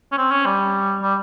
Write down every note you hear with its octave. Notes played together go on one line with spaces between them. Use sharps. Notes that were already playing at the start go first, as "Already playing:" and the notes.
C#4
C4
C#4
G3
G3